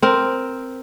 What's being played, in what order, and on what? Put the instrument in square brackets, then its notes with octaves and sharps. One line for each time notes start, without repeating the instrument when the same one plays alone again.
[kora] C4 A#4